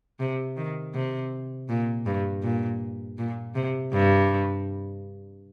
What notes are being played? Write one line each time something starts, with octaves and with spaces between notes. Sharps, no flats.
C3
D#3
C3
A#2
G2
A#2
A#2
C3
G2